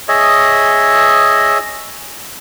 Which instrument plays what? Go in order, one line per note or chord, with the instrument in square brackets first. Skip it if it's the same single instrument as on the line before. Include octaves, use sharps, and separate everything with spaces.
[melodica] G#4 C#5 D#5 E5